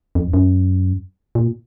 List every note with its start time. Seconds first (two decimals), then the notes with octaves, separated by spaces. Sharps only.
0.15 F2
0.34 F#2
1.35 A#2